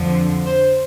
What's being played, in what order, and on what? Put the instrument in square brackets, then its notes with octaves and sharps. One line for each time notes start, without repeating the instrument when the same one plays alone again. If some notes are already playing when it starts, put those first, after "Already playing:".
Already playing: [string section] F2 D3 F3
C5